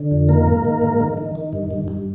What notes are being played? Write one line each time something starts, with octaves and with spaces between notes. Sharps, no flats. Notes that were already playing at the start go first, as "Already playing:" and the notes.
Already playing: D3
F2
D#3 A#3 A#4
G#2
D#3
G#2
D#3
D#3
D#3
G2
G2
G2